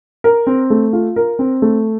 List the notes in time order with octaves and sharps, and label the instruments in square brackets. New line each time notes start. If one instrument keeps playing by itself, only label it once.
[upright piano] A#4
C4
A3
F4
A#4
C4
A3